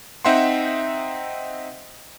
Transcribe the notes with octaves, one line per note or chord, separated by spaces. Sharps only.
C4 D#4 E5 F#5 G5 C6